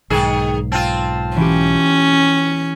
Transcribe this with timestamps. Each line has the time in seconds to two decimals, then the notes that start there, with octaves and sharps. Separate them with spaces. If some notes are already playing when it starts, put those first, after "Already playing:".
0.10 B1 G#2 D#3 G#4 C7
0.72 C4 F4 A5
1.37 E3 C#4 G4